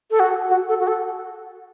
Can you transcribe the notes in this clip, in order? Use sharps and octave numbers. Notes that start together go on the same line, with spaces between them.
A4
F#4
F#4
A4
F#4
A4